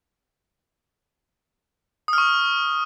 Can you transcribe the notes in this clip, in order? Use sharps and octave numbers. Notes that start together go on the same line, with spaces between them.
C#6 D#6 F6